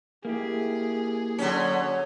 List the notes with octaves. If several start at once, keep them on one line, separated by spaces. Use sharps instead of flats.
A#3 E4 G4 G#4
D3 F#3 C#4